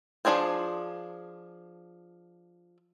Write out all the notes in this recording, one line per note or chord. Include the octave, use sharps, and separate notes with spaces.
F3 B3 D4 G#4 C5